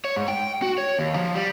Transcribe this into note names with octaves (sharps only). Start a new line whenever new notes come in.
C#5
G#2
G5
F#4
C#5
D#2
F3
G3